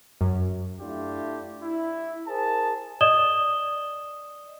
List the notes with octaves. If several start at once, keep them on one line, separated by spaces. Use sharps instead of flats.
F#2
A3 D4 E4 F4 G4
E4
G#4 A#4 C5 A5
D5 D#5 D#6 E7 G7